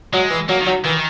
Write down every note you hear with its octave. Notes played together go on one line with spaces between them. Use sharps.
F#3 G#3
E3
F#3 A#3
D#3
F#3
D#3 E3